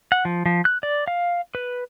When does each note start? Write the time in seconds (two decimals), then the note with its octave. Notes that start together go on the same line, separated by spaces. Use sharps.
0.12 F#5
0.25 F3
0.46 F3
0.65 F#6
0.83 D5
1.08 F5
1.55 B4